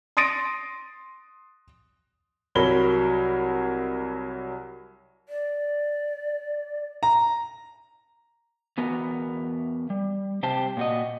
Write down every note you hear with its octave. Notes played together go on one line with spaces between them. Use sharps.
C6 D#6 A6 A#6 D7 D#7
C2 F#3 A#4 C#5 B5 G7
D5
A#5
E2 B3 F#4 A#4
G3
C3 G4 C5 G5 A5
A#2 F#4 D#5